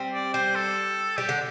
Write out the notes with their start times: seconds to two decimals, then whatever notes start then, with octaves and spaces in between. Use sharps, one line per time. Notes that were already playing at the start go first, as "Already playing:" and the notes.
Already playing: G3 C4
0.13 D5
0.34 G3 C5
0.55 A4
1.18 G3 G4
1.29 D3